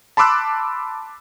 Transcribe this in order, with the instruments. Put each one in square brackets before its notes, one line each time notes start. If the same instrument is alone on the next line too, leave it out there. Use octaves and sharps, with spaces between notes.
[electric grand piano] A5 B5 C6 D6 E6 F#6